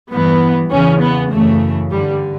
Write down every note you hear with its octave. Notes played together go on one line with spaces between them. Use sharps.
G2 E3 B3
E2 C#3 E3 C#4
B3
F#2 C#3 E3 A3
G2 D3 G3